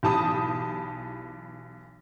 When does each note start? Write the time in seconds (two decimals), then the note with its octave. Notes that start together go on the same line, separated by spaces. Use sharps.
0.03 B1 E3 G4 A5 B5 D#6